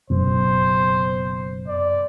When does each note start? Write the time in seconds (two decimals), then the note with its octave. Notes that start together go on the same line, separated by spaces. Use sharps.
0.10 F#1 F#2 B2 C5
1.67 D5